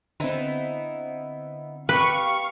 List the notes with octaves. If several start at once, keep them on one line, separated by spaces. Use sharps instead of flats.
D3 B3 C4 D#4 E4
G4 B4 F5 C#6